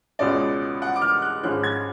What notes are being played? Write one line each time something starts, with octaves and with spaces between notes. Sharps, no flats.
C#2 B2 G#3 C#4 D5
F#5
D6
F6
F#6
G#1 G#2 F3 G#3 C#4 F#6
G#6